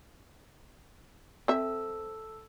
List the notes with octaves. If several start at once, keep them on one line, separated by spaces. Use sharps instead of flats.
C4 A4 E5 E6